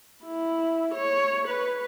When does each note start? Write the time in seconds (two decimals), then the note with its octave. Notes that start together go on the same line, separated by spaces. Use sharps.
0.25 E4
0.95 C#5
1.48 B4